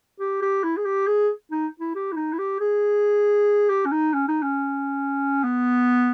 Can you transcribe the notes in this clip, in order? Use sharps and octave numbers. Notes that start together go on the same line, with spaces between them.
G4
G4
E4
G#4
G4
G#4
D#4
E4
G4
E4
D#4
E4
G4
G#4
G4
C#4
D#4
C#4
D#4
C#4
B3